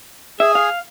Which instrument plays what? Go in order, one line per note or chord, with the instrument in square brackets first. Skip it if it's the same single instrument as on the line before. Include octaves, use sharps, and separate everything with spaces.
[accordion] G#4 [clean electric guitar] E5
[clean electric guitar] F5